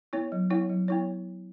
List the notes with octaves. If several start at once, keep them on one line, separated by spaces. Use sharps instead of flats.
B3 E4 C#5
F#3
B3 E4 C#5
F#3
B3 E4 C#5